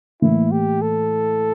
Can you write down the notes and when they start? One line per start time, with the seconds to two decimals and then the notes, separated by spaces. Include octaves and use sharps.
0.22 A2 E3 A#3 E4
0.51 G4
0.82 A4